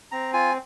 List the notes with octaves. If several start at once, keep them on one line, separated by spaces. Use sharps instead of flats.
C4 A#5
F4 G#5